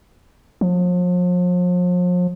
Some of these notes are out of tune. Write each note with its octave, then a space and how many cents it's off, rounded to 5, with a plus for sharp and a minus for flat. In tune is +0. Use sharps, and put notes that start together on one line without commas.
F3 +40